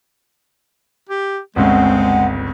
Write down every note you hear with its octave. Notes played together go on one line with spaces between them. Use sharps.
G4
G1 C#2 C#3 G#3 C4 F#5